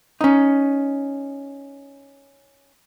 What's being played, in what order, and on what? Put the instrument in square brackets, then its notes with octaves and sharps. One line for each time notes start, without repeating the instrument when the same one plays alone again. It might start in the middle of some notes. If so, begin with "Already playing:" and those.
[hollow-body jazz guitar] C#4 D#4